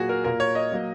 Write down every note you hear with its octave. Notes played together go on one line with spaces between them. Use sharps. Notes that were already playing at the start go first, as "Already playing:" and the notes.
Already playing: A#2 F#3 A#3 F#4 G#4
A#4
A#2 A#3 A#4
C#5
D#5
F#3 A#3